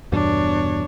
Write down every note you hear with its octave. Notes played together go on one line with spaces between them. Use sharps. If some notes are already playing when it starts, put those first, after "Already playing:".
E2 G2 B2 D4 C#5